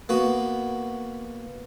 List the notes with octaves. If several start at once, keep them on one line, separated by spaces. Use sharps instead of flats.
A#3 B3 F#4